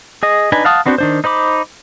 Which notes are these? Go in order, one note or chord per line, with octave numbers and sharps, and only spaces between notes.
G#4 D#5
D4 D#4 B4 G#5
F5 F#5 A5 D#6
B3 C4 D4 F#4 C5
D#3 D4 C5
D#4 C5 B5 D6